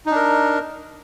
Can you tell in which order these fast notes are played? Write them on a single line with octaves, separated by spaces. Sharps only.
D#4 D4 A#4